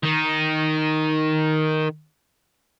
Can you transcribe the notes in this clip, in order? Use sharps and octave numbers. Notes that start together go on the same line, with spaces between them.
D#3 D#4